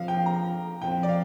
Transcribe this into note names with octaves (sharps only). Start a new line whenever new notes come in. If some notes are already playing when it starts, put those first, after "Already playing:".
Already playing: F2 F3 F5
G5
A#5
F2 F3 G5
D5
F5